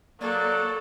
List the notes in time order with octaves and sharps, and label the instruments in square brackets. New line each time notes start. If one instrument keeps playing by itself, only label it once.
[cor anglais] F#3 [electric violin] A#3 [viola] A4 [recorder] D5